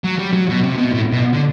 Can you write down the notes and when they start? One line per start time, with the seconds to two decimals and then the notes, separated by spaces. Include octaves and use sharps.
0.04 F#3
0.19 G3
0.33 F#3
0.49 B2
0.64 C3
0.78 B2
0.94 A2
1.12 B2
1.33 D3